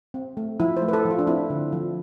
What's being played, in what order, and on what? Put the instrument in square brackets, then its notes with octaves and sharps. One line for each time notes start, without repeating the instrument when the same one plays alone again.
[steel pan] C4
A3
F3 E4
C5
A3
B4
A4
F3
F4
D4
C4 E4
D3
F3